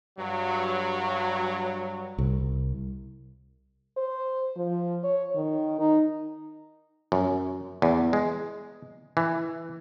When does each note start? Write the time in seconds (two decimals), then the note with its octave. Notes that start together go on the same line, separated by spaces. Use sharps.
0.19 G2 F#3
2.18 C2
3.97 C5
4.57 F3
5.04 C#5
5.36 D#3
5.79 D#4
7.12 F#2
7.82 E2
8.13 G#3
9.17 E3